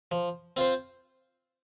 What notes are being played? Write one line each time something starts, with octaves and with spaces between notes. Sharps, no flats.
F3
C4 F4 C5